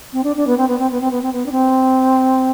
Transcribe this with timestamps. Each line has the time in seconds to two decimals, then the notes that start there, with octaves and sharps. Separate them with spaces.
0.13 C4
0.24 D4
0.36 D4
0.47 B3
0.57 C4
0.68 B3
0.79 C4
0.91 B3
1.01 C4
1.11 B3
1.22 C4
1.33 B3
1.46 D4
1.52 C4